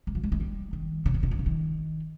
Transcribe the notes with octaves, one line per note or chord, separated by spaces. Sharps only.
G3
F3
G3
G#3
G3
D#3
C#3
C3
C#3
D#3
C#3
D#3